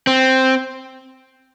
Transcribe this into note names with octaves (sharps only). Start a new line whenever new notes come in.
C4